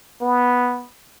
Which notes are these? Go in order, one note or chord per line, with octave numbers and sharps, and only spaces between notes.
B3